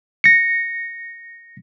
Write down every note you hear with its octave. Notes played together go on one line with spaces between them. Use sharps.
A#6 C#7